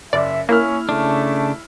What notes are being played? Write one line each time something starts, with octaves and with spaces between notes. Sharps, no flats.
F#1 D5 E5
A#3 C#4 E4 F6
C#3 A3 D4